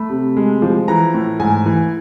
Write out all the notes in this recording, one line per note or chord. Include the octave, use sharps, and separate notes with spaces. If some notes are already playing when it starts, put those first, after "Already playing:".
Already playing: A3 B5
C3
G#3
F3
E3 A#5
A2
G#2 G#5
E3